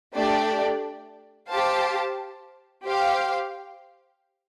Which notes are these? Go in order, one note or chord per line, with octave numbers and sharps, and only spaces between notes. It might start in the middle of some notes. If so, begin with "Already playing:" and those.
A3 D4 G4 D5
G4 C5 F5 A5
G4 C5 F5